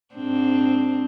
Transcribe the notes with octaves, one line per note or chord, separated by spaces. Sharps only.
G#2 C4 D4